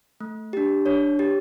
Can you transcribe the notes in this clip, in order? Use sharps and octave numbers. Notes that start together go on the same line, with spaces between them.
A3
D4 G4
D4 C#5
G4